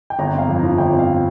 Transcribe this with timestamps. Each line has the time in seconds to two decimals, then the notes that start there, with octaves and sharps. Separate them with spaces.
0.10 G5
0.19 G1 A#5
0.34 C4 F5
0.49 F2
0.59 A#5
0.63 F3
0.78 G1 G5
0.93 C4
0.99 F5